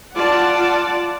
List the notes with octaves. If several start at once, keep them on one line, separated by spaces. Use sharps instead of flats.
F4 D5 F#5 A5